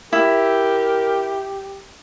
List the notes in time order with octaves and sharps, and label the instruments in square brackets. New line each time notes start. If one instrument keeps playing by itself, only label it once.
[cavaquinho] E4 [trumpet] G4 [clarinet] A#4